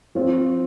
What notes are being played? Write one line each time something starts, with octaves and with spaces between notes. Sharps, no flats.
F3 C4 F4